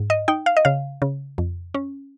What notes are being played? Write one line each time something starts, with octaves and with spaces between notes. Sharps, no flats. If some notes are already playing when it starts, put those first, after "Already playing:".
Already playing: G#2
D#5
D#4 G5
F5
D#5
C#3 F5
C#3
F2
C#4